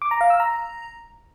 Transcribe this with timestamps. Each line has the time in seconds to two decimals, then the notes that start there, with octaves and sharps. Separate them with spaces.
0.02 D6
0.11 A#5
0.21 F5
0.30 E6
0.40 A#5